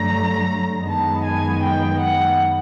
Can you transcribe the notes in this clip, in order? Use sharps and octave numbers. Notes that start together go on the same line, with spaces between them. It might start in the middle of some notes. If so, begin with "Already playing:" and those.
Already playing: G2 D3 F#3 A3 A#5
F#2 D#3 G#3 B3 A5
G#5
G5
F#5